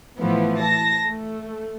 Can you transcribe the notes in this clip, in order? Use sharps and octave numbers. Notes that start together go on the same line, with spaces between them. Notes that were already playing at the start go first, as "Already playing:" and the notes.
A2 E3 F3 B3
A5 A#6
A3